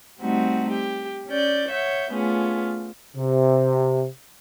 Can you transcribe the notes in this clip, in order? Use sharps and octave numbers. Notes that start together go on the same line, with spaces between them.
G3 A3 C4 D#4 F#4
G4
C#4 D5 G6
C#5 E5 F#5 G6
A3 B3 C#4 F4 G#4
C3